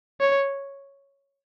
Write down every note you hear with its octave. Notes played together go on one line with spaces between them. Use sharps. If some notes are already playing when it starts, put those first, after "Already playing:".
C#5